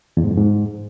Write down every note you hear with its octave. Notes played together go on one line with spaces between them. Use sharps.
E2
G#2
F2
G#2